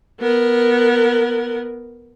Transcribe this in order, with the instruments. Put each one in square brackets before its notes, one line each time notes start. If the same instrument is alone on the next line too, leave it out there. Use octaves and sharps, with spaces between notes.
[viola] B3 A#4